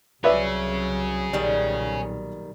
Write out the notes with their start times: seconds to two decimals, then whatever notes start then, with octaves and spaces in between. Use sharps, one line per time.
0.24 C2 F#3 G#4 B4 C#5 D5 E5
1.33 B1 A#2 D#3 G3